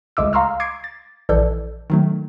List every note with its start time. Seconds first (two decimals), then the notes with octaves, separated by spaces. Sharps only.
0.17 C#2 G#3 A3 D6 E6
0.33 F5 A#5 C6 C#6 E6 F6
0.60 D6 G#6 C7 D7
0.84 A6
1.29 A#1 E3 A4 D5 G6
1.90 D#3 F#3 A3